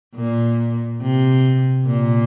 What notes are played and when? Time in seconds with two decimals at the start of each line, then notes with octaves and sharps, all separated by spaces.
0.16 A#2
1.01 C3
1.85 A#2